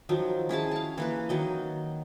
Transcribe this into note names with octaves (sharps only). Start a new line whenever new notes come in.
D#3 F3 F#3
C#4 E4 G#4 A5
F5 A5
E3 A#3 B4
D#3 F#3 D#5